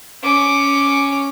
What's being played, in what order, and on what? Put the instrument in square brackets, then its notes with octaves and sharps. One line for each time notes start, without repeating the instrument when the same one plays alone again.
[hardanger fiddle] C#4 D6